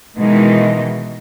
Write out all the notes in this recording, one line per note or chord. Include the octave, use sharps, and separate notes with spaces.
B2 D#3 E3 G#3 D#4